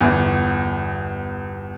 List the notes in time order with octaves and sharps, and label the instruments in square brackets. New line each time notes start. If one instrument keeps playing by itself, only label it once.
[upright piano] G1 E2